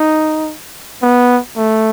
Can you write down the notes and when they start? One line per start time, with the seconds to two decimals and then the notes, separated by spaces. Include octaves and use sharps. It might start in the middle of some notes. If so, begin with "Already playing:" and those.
Already playing: D#4
1.02 B3
1.56 A3